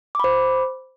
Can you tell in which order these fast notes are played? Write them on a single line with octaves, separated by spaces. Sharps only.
D6 B5 C5